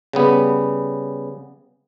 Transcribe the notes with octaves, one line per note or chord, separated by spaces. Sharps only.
C#3 G3 B3